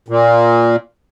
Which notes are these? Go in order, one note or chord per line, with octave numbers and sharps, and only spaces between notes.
A#2